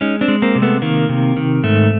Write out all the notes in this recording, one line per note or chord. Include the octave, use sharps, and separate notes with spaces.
G#3 C#4 D#4
C4 D4
G#3
A#3 C4
C3
A3 B3
D#3 A#3
C3
D#3
G#2 A3